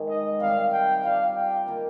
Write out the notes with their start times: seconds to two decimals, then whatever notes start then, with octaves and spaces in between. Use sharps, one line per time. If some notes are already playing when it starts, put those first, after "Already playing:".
Already playing: G#2 D#3 G#3
0.09 D#5
0.40 C3 D#3 G3 F5
0.72 G5
1.03 G3 D4 F4 F5
1.35 G5
1.66 D#3 A#3 F4 A#4